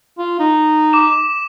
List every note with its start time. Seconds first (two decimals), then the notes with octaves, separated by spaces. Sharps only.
0.18 F4
0.40 D#4
0.93 D6 E7